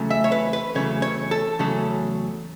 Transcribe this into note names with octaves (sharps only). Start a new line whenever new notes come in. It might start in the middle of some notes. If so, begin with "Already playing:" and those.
Already playing: E2 C#3 F#3 A3 C#4
E5
C#5
B4
B4
E2 C#3 F#3 A3 C#4 C#5
C#5
A4
E2 C#3 F#3 A3 C#4 A4